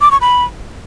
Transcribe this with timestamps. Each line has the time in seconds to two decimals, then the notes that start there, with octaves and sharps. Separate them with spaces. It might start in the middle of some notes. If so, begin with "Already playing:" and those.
0.01 D6
0.11 C#6
0.21 B5